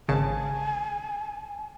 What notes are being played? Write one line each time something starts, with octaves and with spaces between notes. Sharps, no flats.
G#1 C#3 G#5 A5